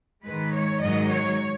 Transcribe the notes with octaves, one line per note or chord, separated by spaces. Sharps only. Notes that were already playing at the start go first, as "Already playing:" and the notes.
G#2 D#3 G#3 B4
C#5
G#2 D#3 F#3 D#5
C#5